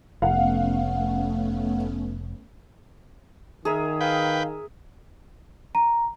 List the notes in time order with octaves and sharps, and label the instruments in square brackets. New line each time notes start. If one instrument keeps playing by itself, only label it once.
[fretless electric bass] F1 [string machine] A3 B3 C#4 [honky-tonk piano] F5 F#5
[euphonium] D#3 [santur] G#4 A#4 E5
[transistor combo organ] B4 G5 [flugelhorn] F5
[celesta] A#5